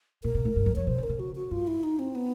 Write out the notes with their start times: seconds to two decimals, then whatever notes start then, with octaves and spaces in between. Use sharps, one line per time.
0.24 A#2 A#4
0.35 B2
0.45 A2
0.56 G2
0.66 F#2
0.76 F2 C#5
0.87 B2 C5
0.98 C#3
1.03 A#4
1.09 C#3
1.19 F#4
1.35 F#4
1.51 G2 F4
1.67 E4
1.83 D#4
1.99 C4
2.15 B3